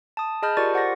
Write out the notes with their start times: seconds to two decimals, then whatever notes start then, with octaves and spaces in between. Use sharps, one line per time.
0.17 A5 D#6
0.42 G#4 D#5 A5 B5 F6 G6
0.57 F4 G4 A#4 D5 C#6 A6
0.74 C5 F#5 C#6 A#6